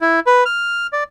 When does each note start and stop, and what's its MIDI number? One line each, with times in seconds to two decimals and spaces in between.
0.01 0.20 64
0.26 0.44 71
0.46 0.87 89
0.93 1.04 74